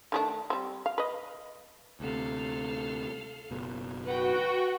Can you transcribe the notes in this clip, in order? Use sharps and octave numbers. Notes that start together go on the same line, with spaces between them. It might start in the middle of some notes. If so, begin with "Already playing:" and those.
D#3 A3 D4
G3 C4
F5
B4 D#5
D2 C3 A4 F5
F#1 B2
F#4 B4 F#5 G5